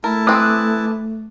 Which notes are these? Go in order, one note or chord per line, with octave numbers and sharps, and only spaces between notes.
A3 E4 A#4 A5
E3 C4 D6 D#6 F#6